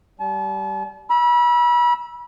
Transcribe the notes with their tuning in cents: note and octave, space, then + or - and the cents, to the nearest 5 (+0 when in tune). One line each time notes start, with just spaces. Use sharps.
G3 -15 A5 -40
B5 -35 E6 +0